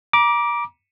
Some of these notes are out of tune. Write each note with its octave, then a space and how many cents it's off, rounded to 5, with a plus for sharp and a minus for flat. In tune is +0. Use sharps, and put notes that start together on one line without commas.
A#5 +40 D6 +0